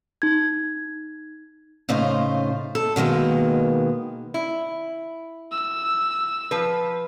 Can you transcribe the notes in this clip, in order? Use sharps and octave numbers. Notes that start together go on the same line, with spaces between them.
D#4 G#6
A2 C#3 D#4 F4 C5
A4
B2 D#3 G#3 A#3 B3
E4
E6
F3 B4